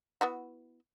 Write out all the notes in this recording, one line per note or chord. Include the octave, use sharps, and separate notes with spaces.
B3 E4 F#4